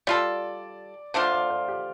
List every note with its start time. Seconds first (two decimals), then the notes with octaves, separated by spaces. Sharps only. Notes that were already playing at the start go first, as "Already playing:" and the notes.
0.07 G3 F4 A4 D5
1.14 D3 A3 D4 F4 C5
1.33 D5
1.50 C5
1.68 G4